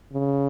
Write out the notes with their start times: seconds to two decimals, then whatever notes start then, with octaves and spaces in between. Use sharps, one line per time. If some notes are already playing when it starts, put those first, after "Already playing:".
0.13 C#3